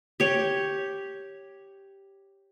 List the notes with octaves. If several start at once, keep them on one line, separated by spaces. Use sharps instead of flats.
G4 C#5